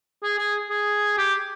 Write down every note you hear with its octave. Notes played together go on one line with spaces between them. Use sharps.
G#4
G#4
G#4
G4